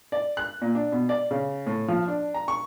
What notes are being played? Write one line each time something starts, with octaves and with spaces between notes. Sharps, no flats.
D5
F#6
A#2
D4
B2
D5
C#3
A2
F3
D4
A#5
C#6